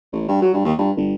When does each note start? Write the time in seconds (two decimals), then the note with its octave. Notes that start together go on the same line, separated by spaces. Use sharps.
0.12 A1
0.28 G2
0.42 F#3
0.53 G2
0.65 D#2
0.78 G2
0.97 G1